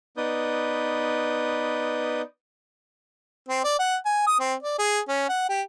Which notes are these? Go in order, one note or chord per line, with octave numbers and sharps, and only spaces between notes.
B3 D#4 B4 D5 D#6 G6
C4
D5
F#5
G#5
D#6
C4
D5
G#4
C#4
F#5
G4